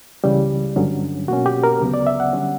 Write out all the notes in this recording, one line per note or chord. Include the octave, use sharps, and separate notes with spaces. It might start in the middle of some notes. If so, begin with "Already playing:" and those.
C#2 C#3 E3 G3
G2 D3 F#3 C#4
B2 A#3 C#4 F#4
G4
A#4
D2 C#3 F#3 B3
D5
E5
F#5
D3 G3 C#4